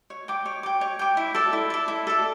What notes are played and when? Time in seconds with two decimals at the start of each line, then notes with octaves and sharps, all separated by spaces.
0.10 C#5
0.28 G5 D6
0.46 C#5
0.63 G5 D6
0.81 C#5
0.99 G5 D6
1.17 E4
1.35 A4 D5
1.53 E4
1.70 A4 D5
1.88 E4
2.07 A4 D5